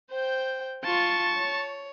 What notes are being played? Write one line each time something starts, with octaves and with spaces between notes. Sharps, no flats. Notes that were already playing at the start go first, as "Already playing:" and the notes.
C5 G5
F4 A5 C6 C#6
C#5